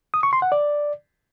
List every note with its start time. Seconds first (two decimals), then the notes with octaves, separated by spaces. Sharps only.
0.14 D#6
0.23 C#6
0.33 C6
0.42 F#5
0.52 D5